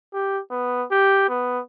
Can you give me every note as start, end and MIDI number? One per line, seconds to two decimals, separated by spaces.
0.14 0.40 67
0.51 0.85 59
0.91 1.25 67
1.29 1.61 59